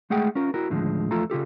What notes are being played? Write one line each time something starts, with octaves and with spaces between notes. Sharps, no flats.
G#3 A3 G#4 F#5 G5
C#4 F4 A#4
E4 F#4 A#4
D#2 A2 D3 F3 G#3
E2 F3 A3 F4 A4 A#5
C#3 F4 G4 A4